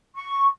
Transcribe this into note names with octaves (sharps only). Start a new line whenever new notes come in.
C#6